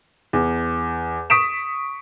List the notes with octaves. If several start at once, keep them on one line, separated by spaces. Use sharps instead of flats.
E2
C#6 D#6 B6 D7 E7